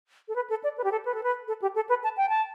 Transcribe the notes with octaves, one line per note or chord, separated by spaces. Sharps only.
A4
B4
A4
D5
B4
G4
A4
B4
A4
B4
A4
G4
A4
B4
A5
G5
A5